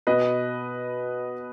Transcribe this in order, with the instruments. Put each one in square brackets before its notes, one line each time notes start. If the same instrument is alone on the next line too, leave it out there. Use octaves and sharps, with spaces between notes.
[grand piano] B2 B4 D#5